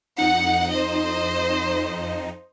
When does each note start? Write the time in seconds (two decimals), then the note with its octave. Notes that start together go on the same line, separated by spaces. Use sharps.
0.18 F2 D#4 F#5
0.71 C5 D#5